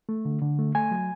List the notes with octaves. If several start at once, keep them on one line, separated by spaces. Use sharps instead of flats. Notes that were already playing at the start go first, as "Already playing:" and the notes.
A3
D3
D3
A3
A3 G#5
F#3